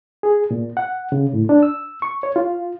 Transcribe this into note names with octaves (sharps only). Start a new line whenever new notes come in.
G#4
A#2
F#5
C#3
A2
D4
E6
C#6
C#5
F4